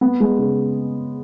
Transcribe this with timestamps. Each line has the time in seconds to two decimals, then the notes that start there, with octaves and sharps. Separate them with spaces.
0.01 B3
0.20 G#3
0.39 C#3